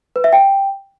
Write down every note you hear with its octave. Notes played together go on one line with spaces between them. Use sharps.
B4
E5
G5